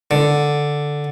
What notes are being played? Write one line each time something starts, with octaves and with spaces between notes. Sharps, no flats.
D3